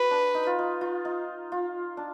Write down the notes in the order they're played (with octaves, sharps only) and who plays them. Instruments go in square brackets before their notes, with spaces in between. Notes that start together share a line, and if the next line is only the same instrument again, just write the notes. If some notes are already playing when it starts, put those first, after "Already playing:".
Already playing: [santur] F#4 [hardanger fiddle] B4
[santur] D4
D#4
F4
D#4
F4
D#4
F4
D4